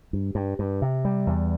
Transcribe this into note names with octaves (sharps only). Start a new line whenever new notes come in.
G2
G2
G2
C3
G3
E2